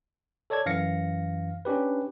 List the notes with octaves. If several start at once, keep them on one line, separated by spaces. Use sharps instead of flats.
A4 C#5 D5 A5 G#6
F#2 E3 F5 A#6 C#7
C#4 D4 G4 B4